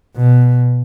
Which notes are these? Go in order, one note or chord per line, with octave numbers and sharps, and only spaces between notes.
B2